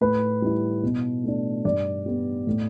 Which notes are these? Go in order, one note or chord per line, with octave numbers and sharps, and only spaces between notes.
A2 B4
G3 E4
B2
A3 D4
G2 D5
G3 B3
A2